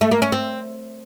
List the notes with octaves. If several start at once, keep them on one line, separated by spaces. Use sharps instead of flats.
A3
A#3
C#4
C4